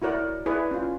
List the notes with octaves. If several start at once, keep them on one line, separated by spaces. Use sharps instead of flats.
E4 F#4 A#4 C#5 D5
E4 G#4 B4 C#5 D5
C#4 F4